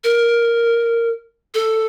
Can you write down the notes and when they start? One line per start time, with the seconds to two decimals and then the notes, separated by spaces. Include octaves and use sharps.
0.04 A#4
1.55 A4